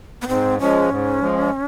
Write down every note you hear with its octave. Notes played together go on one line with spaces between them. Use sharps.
B3
G#2 C4
F3 G#3 C#4
G#2
F3 G#3